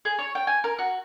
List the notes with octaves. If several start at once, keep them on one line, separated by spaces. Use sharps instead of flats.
G#4
C#5
G5
G#5
A#4
F#4